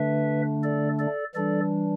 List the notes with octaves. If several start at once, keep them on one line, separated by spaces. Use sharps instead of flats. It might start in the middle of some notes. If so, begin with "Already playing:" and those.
Already playing: D3 A3 D4 B4 E5
A4 D5
A4 D5
E3 G3 D4 A4 D5